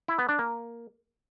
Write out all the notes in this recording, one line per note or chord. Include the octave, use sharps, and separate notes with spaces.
E4
B3
D4
A#3